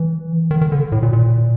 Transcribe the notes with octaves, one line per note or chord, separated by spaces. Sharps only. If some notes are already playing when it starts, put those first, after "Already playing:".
Already playing: E3
D#3
D#3
D3
A2
A#2
A#2